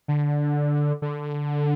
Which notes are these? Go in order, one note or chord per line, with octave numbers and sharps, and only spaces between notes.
D3
D3